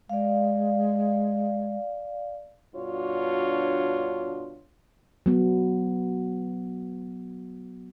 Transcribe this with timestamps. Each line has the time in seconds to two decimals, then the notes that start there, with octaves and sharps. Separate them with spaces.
0.09 G#3 D5 F5
2.75 G2 B2 D4 F4 F#4 C#5
5.26 F#3 B3